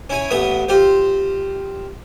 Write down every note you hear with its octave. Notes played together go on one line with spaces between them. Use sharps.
C#4 E4 G#5
A1 A2 B3 B4 E5 D#6
C4 F4 G4 C5